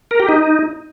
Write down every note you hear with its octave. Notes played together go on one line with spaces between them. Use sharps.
A#4
G4
D#4